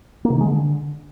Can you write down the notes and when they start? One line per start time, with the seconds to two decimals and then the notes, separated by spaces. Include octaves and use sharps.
0.25 A#3
0.30 C3
0.35 D#3
0.41 G#3
0.46 D3